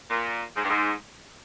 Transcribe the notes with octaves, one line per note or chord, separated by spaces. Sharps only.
A#2
G#2
G2
G#2